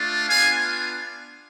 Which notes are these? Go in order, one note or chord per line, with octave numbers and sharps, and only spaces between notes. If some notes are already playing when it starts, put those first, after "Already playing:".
Already playing: A3 D4 F4
B3 D4 F4 F5 G#5